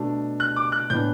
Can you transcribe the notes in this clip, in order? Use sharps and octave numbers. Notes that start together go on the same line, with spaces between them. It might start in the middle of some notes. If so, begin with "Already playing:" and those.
Already playing: B2 A3 D4
F#6
D6
F#6
A2 E3 B3 D4 G6